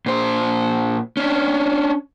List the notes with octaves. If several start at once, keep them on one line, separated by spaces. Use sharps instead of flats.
A#2 C5
C#4 D4